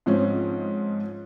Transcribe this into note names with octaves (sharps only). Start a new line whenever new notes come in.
G#2 F3 C4 C#4